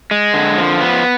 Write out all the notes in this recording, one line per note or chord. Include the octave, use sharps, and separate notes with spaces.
G#3
D3
F3
B3